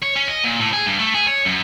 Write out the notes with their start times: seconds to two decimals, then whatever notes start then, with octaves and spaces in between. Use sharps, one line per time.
0.02 C#5
0.16 C#4
0.28 D#5
0.44 A#2
0.60 A2
0.73 G#4
0.87 G2
1.00 A3
1.14 G#4
1.28 C#5
1.46 F#2